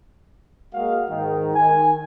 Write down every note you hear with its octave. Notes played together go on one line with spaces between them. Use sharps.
G#3 A#3 F#4 D#5 F5
G#2 D#3
D#3 G#5